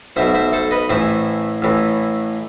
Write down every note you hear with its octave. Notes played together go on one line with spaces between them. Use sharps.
B1 B2 C5 E5
C5 E5
A4 C5
B4 D#5
A1 A2 E3 C5 E5
A1 A2 E3